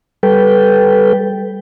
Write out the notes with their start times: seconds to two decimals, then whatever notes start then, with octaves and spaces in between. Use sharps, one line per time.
0.23 G3 A4 B4 G5